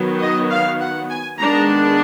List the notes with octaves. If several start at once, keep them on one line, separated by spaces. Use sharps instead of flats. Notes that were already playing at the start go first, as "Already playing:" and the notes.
Already playing: D#3 F#3 B3
D#5
F5
F#5
G#5
D#3 G#3 B3 D4 A#5